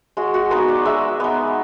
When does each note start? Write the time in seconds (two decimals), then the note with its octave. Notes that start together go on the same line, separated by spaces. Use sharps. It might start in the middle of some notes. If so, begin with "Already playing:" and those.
0.17 G#3 F#4
0.34 F#4
0.51 B3 D#4 C5
0.68 D5
0.85 G#3 E5
1.20 B3 D#4